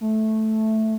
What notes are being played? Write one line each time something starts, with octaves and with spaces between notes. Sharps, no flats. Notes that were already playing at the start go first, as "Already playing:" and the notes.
A3